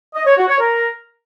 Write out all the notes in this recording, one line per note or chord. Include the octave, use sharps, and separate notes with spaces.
D#5
C#5
F#4
C#5
A#4